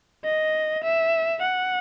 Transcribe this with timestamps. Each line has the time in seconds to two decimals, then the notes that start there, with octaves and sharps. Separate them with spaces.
0.24 D#5
0.83 E5
1.41 F#5